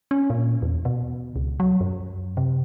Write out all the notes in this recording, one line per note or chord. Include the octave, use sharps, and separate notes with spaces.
C#4
A#2
E2
B2
C#2
F#3
F#2
C3